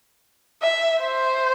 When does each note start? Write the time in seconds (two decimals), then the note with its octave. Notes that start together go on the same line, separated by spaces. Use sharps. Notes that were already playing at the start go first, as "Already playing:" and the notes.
0.62 E5
1.02 C5